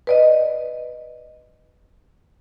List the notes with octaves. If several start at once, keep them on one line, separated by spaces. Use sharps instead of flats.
B4 D5 D#5